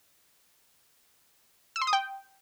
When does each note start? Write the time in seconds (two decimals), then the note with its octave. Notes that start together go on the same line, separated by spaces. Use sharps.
1.76 E6
1.82 C6
1.87 D#6
1.93 G5